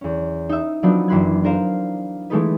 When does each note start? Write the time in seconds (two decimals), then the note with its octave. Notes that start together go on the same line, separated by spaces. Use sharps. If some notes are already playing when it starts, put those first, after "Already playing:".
0.01 E2 C#4
0.49 D#4 E5
0.83 F3 F#3 B3 C4 D4 D#4
1.08 F#1 E3 B5 C6 F#6 G#6
1.44 D4 A#4 C5 F5
2.30 E3 G#3 A3 B3 D#4 B4